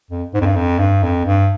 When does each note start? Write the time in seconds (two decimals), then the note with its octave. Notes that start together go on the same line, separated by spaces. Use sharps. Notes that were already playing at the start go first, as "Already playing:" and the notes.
0.11 F2
0.34 G#2
0.41 F2
0.46 G2
0.56 F2
0.79 G2
1.03 F2
1.25 G2